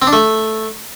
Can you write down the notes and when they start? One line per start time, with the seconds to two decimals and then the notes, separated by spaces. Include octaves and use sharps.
0.02 C4
0.07 D4
0.13 A3